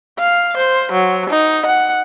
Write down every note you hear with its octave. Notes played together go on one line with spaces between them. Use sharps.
F5
C5
F#3
D#4
F#5